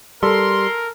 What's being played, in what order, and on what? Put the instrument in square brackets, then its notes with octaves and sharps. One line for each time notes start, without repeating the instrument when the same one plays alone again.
[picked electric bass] G3 [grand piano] A4 [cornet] A#4 [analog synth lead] C6